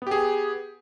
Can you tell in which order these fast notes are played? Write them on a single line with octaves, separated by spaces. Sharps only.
B3 G4 G#4